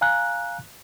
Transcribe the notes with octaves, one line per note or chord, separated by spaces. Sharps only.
F5 G#5 A#5 F#6